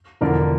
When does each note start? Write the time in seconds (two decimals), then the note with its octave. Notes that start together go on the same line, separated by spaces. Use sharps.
0.21 E1 E2 D3 F3 A#4 D5